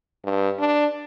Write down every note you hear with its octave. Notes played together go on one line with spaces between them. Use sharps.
G2
D4